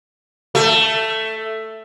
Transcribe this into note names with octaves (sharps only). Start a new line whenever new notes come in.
A3